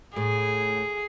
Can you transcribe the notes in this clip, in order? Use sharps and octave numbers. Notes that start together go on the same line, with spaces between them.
A2 G#4